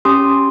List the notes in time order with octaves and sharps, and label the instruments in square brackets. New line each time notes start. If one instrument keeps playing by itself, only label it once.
[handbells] C#4 G4 C6 D#6